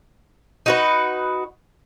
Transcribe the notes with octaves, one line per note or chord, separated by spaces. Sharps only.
D#4 F#4 B4